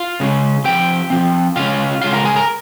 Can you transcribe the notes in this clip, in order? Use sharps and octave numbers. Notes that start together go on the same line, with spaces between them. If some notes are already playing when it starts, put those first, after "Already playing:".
Already playing: F4 F5
C#3 G#3 C#4
F3 C4 G4 G5
F3 C4
C#3 G#3 C#4 F4 F5
C#3 G#3 C#4 F4 F5
A#4 A#5
G#4 G#5
A#4 A#5